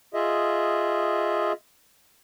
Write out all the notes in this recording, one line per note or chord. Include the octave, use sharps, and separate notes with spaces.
F4 G#4 D#5 E5